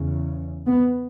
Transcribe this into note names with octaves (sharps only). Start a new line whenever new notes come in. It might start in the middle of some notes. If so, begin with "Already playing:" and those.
Already playing: E2 C#3
B3